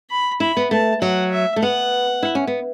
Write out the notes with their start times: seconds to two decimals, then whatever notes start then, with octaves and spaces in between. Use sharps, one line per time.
0.11 B5
0.40 E4 B5
0.57 B3
0.71 A3 A5
1.02 F#3 F#5
1.32 E5
1.56 A3
1.62 B3 F#5
2.23 E4
2.35 C#4
2.47 B3